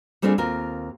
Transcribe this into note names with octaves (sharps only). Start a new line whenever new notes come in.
G3 A3 C4 D4 F4 G#4
D#2 C4 F4 A#4